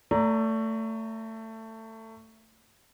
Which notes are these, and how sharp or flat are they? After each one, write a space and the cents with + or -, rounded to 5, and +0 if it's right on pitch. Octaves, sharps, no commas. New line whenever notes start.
A3 +20 D5 -30 A#5 -10